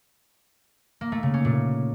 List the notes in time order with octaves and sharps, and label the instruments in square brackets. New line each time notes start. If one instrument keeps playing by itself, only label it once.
[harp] A#3
A3
C#3
C#4
A#2